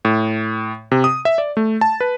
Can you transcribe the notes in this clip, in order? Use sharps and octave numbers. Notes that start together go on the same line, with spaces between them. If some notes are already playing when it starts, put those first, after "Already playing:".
A2
C3
D#6
E5
D5
A3
A5
B4